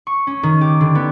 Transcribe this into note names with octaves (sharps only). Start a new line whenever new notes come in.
C#6
C#4
D#3
G4
D3
B3